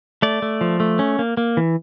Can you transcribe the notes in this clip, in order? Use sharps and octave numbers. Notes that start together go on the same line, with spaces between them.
A3 D5
A3
F3
A3
C#4
A#3
A#3
E3